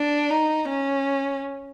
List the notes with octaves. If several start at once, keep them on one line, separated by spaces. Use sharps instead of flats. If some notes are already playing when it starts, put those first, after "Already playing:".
Already playing: D4
D#4
C#4